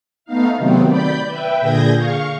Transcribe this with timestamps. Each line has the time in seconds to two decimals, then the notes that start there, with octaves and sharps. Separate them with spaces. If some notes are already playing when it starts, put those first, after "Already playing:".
0.25 A3 B3 D#4 F5
0.58 C3 D#3 F#3 A3 B3 C4
0.86 D5 B5 G6
1.27 B4 E5 G5
1.60 A#2 D3 G#4 G6 G#6 A#6
1.96 F5 C#6